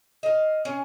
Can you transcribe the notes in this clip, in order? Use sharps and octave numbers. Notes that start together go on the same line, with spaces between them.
D#5 F5
C#4 G#4